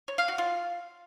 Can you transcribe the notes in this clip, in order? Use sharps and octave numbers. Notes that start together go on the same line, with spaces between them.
C#5
F5
F#4
F4